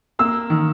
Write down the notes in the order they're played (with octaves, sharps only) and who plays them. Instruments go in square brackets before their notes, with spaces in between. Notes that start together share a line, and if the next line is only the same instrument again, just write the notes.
[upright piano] A#3 E6
D#3